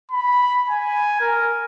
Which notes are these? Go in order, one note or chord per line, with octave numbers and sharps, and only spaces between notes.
B5
G#5
A#4